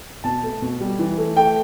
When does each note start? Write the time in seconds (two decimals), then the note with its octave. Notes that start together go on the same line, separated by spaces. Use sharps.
0.24 B2 A5
0.43 A3
0.62 B2
0.80 G3
0.99 E3
1.18 A3
1.36 A3 G5